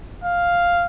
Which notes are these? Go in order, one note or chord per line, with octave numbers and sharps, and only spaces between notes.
F5